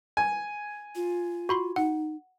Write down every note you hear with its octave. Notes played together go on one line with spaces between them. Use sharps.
G#5
F4
F#4 B5 C6
D#4 F#5